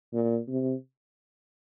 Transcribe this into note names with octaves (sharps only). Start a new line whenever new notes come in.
A#2
C3